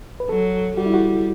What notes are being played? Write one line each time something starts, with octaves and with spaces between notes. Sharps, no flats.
B4
F#3 A4
G3 F#4
E4
F#4